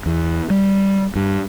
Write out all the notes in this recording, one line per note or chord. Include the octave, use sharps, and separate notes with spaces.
E2
G3
G2